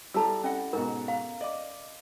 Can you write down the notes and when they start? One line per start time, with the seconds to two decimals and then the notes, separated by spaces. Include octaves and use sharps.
0.14 G3 E4 A4 A5 A#5 E6
0.44 C#4 E4 D#5 F#5
0.73 G#2 B2 A#4
1.08 F5 A#5
1.41 D5 D#5 D6